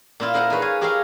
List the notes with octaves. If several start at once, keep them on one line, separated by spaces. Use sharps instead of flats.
A#2 E4 F4
E4 A#4 C5 D#5 F5 F#5
D#4 G#4 B4 C#5
C#5 F5 G#5
G4 G#4 A#4 C#5 E5 F5